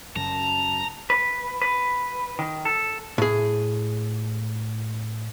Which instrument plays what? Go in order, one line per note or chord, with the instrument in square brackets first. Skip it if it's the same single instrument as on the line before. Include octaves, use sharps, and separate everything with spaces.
[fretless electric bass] F#2 C#3 F#3 [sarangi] A5 [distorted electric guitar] A#5
[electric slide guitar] B4
B4
D#3
A4
[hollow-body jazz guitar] A2 G#4